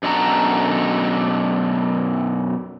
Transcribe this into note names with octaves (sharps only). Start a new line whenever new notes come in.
F#2 B2 D4 F#4 A4 A#5